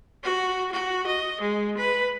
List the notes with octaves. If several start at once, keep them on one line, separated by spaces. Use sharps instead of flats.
F#4
F#4
D#5
G#3
B4